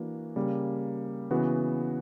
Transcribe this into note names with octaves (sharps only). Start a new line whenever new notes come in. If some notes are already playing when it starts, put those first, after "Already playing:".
Already playing: E3 A#3 D4 F#4
C#3 G3 A#3
C#3 E3 B3 F#4